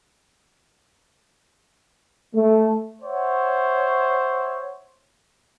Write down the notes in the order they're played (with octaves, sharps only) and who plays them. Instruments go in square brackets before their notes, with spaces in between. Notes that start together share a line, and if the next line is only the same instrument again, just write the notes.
[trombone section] A3
[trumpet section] C5 C#5 E5 F#5